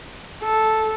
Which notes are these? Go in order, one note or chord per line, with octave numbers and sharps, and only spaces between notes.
A4